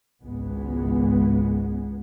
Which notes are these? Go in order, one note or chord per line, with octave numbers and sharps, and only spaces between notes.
G#1 C#2 G#3 B3